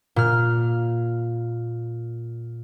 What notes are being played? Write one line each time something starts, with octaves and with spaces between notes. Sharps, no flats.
A#2 F6